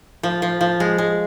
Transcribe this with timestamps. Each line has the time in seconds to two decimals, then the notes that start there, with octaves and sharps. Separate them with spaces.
0.23 F3
0.42 F3
0.61 F3
0.80 G#3
0.98 G#3